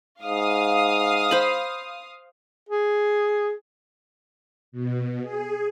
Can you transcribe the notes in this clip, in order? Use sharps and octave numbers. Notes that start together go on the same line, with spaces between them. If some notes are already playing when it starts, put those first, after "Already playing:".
G#2 F5 D#6
C5 B5
G#4
B2
G#4